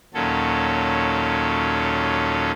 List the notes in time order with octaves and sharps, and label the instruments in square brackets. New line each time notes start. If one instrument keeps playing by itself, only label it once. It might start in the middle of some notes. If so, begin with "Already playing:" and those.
[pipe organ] D#2 A#2 F#3 C#4 A4